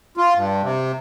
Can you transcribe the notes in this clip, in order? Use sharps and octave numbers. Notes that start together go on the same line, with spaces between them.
F4
G2
C3